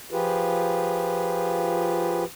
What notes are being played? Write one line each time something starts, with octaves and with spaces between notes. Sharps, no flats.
F3 F4 G4 G#4 B4